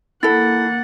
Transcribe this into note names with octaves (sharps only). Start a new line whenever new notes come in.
A#3 E4 A4 F#5 A6